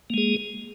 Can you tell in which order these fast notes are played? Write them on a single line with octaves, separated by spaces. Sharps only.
A#3 G#3 G#4